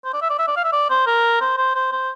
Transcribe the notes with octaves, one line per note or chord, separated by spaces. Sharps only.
C5
D5
E5
D5
E5
D5
F5
E5
D5
C5
A#4
C5
C5
C5
C5